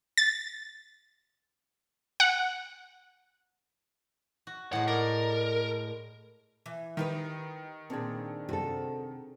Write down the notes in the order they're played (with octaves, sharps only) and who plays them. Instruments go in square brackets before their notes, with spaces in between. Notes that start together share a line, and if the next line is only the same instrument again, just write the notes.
[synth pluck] A6
F#5
[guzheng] F#4
[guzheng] A2 G#3 [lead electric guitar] F#5
[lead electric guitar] A#4 [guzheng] D5
[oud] E3
[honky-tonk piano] D#3 [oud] D#4 G4 B4
[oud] A#2 A4 [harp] C4 D4 G#4
[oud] C3 [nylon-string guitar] F#4 A4